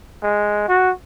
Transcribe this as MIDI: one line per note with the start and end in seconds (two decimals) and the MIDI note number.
0.23 0.68 56
0.68 0.91 66